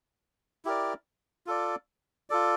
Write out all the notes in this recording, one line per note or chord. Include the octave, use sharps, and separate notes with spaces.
E4 G4 A#4 D5
F4 A4 D5
F4 A4 D5